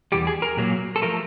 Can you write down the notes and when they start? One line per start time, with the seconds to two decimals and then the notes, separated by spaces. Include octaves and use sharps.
0.12 E2 C3 E3 G3 G4
0.27 G#4
0.42 A#4
0.57 A#2 F#3 A#3
0.96 A4
1.02 F3 A3 A#4